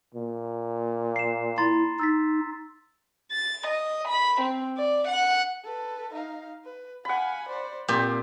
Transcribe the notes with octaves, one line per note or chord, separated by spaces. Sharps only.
A#2
C7 E7
E4 A#5 C6 A6
D#4 E6 A6 B6
A6
D#5
B5
C4
D5
F#5
A4 B4
D#4 F5
B4
F5 F#5 G#5 B5
C5 D5
A#2 C4 G4 F5 G5